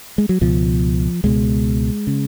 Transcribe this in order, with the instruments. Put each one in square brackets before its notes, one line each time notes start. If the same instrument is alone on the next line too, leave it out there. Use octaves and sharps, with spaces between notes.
[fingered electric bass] G#3
F#3
C#2 B2 F3
C#2 B2 G#3
C#3